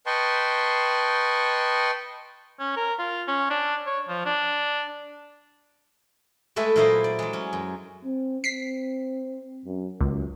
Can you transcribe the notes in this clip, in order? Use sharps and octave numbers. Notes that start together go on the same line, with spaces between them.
B4 D#5 G5 A5 C6 C#6
C#4
A#4
F4
C#4
D4
C#5
F3
D4
G#3 A3 A4 B4 E5 G#5
A#2 F#3 E4 C5 D5 D#5
D5
F#3 G#3
C#4
F#2
C4
C4 B6 C7
F#2
C#2 F#2